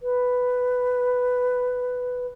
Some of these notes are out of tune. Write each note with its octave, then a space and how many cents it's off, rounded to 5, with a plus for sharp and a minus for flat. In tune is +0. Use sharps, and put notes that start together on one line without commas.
B4 +10